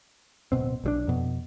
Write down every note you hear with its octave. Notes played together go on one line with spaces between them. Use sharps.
D1 B2 C4
B1 F#3 D4
F2 B2